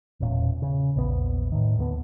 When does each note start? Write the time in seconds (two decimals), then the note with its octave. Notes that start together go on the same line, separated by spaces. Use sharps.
0.20 E1 E2 A#2 C#4
0.62 C#3
0.96 A#1 E2 B3
1.52 A2 D#3
1.78 D#2 D3 F#3 B3